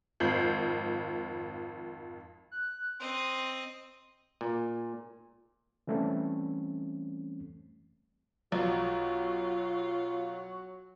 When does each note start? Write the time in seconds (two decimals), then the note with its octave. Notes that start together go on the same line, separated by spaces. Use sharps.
0.20 G#1 F2 G6 C7 F#7
2.51 F#6
2.99 C4 D#5 C6
4.41 A#2
5.87 E3 G3 A3 C4 C#4
8.52 B1 F#3 F4